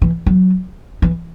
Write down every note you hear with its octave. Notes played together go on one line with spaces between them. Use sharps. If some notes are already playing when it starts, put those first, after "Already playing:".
E3
F#3
E3